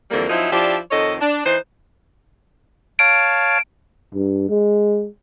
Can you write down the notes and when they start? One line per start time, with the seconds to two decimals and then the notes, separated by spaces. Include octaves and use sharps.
0.11 F2 D3 E3 G3 A#3 A#4
0.29 F3 F#3 C4 D#4 E4
0.52 F3 D4 E4 G4 D5
0.91 F2 D#3 A4 C#5 D#5
1.20 D4
1.45 E3 D#4 B4 C5
2.99 C#5 F5 A5 D7
4.14 G2
4.49 G#3